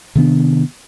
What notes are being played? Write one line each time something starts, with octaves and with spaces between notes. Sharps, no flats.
C3 D#3 B3 D4